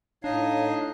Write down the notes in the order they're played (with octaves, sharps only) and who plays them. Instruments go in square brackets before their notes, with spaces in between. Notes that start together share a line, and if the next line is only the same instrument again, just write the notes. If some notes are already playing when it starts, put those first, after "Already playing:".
[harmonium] A2 [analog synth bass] D4 [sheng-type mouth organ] D#4 D#5 [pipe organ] C#5 F5